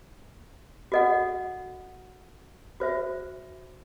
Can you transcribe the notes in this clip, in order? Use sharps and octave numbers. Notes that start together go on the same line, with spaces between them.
F#4 A4 D#5 F#5
F#4 C5 E5